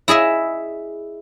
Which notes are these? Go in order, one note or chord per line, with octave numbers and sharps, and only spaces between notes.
E4 G#4 D#5 E5